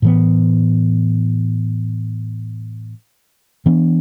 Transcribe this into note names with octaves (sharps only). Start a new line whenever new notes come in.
A2 E3 B3
E3 B3 D4